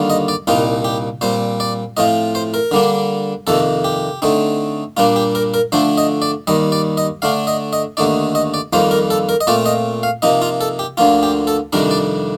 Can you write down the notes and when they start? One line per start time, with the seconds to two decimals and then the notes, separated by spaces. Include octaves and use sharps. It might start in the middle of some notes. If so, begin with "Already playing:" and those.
Already playing: D#2 D3 G3 A#3 F4
0.10 D#5
0.28 D5
0.47 C2 A#2 G3 C4 D#4 F4
0.85 G4
1.21 A#2 G3 C4 C5
1.60 D5
1.97 A2 F3 C4 F4 D#5
2.35 C5
2.54 A#4
2.71 D3 G3 A#3 D4
3.47 F2 C3 D#3 A#3 A4
3.84 G4
4.22 D3 A3 C4 D#4
4.97 A#2 G3 A#3 D4 F4
5.16 G4
5.35 A#4
5.54 A#4
5.72 D3 F3 A3 D4 C5
5.98 D#5
6.22 D5
6.47 D#2 D#3 G3 D#5
6.72 D5
6.97 D#5
7.22 D3 A3 D4 F5
7.47 D#5
7.73 D#5
7.97 D#2 D3 A3 D#4 D5
8.35 D#5
8.54 D5
8.73 F2 D#3 G3 A#3 F4 C5
8.91 A#4
9.10 A4
9.29 A#4
9.41 D#5
9.47 A#2 A3 C4 F4 D5
9.66 D#5
10.03 F5
10.22 C3 F3 A#3 D#4 D#5
10.42 F4
10.61 A4
10.79 G4
10.97 D2 D3 F3 A#3 F4
11.23 G4
11.47 A4
11.73 F2 C3 D#3 G3 D4 A#4
11.91 D5